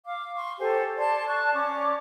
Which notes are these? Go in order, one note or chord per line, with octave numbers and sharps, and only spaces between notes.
F5 D6
C6 C#6
G4 A4 C5 G#5
D5 A5 C6 G#6
A5 C#6 F#6
C#4 D5 D6